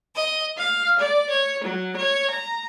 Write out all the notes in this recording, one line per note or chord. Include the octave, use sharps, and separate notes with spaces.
D#5
F5
D5
C#5
F#3
C#5
A#5